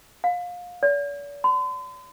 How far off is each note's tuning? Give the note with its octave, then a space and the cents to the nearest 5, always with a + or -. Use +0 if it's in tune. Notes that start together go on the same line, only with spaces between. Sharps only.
F5 +25
D5 -45
C6 -45